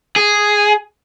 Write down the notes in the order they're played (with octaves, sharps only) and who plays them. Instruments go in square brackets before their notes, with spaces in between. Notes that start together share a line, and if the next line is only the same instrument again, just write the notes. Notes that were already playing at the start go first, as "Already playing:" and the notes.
[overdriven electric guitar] G#4